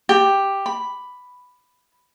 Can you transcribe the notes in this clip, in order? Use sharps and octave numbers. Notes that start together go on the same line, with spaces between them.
G4
B5